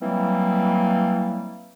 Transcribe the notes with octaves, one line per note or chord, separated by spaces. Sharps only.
E3 F#3 G3 A#3 C4